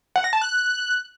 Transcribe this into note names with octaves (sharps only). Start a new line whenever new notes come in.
F#5
A#6
A5
F#6